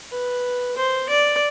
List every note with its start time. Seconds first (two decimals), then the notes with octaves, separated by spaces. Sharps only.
0.11 B4
0.77 C5
1.09 D5